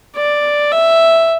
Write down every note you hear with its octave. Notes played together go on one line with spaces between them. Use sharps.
D5
E5